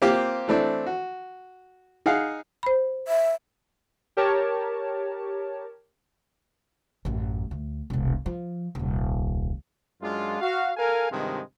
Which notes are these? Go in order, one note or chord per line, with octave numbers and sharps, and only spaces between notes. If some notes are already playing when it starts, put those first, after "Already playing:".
A#3 C4 F4 G4
E3 A3 C4 D4
F#4
D#4 G#4 F5 F#5
C5 B5
E5
G4 A#4 C#5 A5
A1 F#2
D2
E1 C2
F3
D#1 C2
F#2 G#3 D4 F4
F#4 F5
A4 A#4 F5 G#5
G2 C3 D#3 F3 G#3